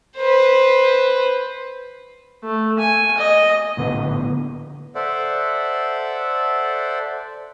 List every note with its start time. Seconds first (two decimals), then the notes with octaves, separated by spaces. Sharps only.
0.17 B4 C5
2.44 A3
2.79 G#5
3.18 D#5
3.77 A#1 A2 D3 B3
4.95 A4 C5 D5 E5 F#5